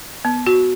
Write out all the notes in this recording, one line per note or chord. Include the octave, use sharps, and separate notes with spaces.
B3
F#4